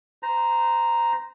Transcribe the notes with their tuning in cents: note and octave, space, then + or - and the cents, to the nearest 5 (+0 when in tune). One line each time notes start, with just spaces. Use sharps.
C5 -30 A#5 +0